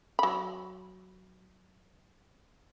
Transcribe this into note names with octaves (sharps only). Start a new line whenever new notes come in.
F#3 B5